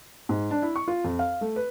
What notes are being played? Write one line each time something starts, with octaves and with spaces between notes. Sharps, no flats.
G#2
D4
E4
C#6
F4
F2
F5
A3
B4